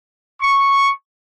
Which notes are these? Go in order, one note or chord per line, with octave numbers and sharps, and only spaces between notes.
C#6